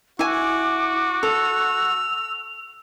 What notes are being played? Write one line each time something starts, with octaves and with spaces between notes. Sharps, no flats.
E4 F#4 G#5 D6
A4 E6 F7